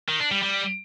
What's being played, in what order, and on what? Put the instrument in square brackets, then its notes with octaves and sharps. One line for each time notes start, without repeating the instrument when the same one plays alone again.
[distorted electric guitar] D#3
D4
G3
G3